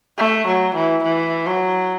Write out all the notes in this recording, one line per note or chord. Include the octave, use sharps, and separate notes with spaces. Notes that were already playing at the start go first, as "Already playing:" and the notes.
A3
F#3
E3
E3
F#3